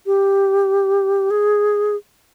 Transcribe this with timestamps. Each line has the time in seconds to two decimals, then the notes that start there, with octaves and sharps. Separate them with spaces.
0.06 G4
1.31 G#4